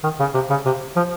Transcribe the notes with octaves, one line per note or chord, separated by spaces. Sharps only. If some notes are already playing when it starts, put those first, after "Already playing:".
D#3
C#3
C3
C#3
C3
F3